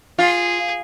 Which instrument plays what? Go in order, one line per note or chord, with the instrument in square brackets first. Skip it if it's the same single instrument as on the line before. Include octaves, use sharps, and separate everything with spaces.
[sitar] F4 [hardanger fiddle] G#4